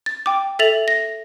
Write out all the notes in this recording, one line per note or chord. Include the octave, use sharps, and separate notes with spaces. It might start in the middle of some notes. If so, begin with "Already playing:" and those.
A6
G5 D6
A4 E5 A6 F7 F#7
A#6